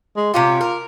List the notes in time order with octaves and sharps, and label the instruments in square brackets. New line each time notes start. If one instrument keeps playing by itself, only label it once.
[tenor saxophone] G#3
[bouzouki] C3 C#4 G4 [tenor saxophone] F4
[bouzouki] A#4